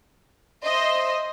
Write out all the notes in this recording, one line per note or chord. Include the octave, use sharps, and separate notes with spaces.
C5 D#5 E5 C6